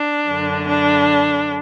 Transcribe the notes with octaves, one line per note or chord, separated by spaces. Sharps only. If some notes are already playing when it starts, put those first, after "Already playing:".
Already playing: D4
F#2 D3
D4